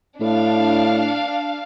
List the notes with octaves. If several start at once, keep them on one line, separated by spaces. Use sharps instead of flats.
A2 D4 F5